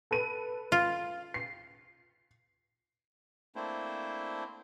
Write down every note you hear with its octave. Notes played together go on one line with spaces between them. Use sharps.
A4 B4 D#7
F4
C7
A3 A#3 C4 D4 E4 C5